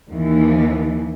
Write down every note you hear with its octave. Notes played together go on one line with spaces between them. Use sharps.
D#2 E3